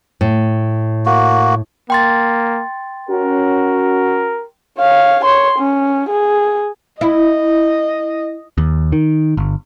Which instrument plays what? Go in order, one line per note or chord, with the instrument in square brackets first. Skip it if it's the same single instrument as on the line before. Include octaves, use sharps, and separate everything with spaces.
[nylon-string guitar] A2
[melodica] A#3 F#4
[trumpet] A#3 [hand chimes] G5 C6 A6
[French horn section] C#4 F#4 [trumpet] A#4
[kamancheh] C#5 F5
C#5 C6
C#4
G#4
[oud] E4 [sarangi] D#5
[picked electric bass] D#2
D#3
G1